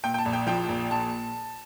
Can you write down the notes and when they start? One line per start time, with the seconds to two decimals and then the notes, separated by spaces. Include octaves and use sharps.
0.03 A#2 G5
0.14 G5
0.18 A5
0.25 A#1
0.33 G5
0.47 F3 G5
0.69 A#1
0.91 A#2 A5